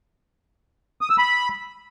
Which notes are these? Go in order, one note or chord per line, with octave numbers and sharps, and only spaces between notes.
D#6
E6
B5